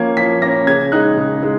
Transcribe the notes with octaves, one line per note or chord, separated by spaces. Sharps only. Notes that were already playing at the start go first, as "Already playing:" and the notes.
Already playing: F3 A#3 C#4 G#6
F3 B6
A#3 C#4 A#6
C#3 G#6
G#3 D#4 F#6
C#3
G#3 D#4